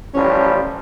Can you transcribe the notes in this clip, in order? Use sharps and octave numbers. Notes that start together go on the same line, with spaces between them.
A1 F3 G3 C#4